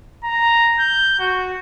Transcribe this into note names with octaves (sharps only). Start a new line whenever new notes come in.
A#5
G6
F#4